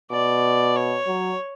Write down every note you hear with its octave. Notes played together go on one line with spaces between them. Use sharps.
B2 D5
C#5
F#3